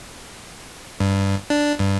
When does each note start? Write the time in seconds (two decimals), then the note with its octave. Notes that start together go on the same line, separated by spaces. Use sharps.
1.00 G2
1.50 D4
1.79 G2